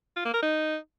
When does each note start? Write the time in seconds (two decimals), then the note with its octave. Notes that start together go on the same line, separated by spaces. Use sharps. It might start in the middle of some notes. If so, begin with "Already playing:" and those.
0.16 F4
0.25 A#3
0.34 A#4
0.42 D#4